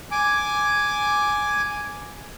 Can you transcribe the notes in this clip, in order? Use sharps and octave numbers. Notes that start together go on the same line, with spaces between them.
G#5 D6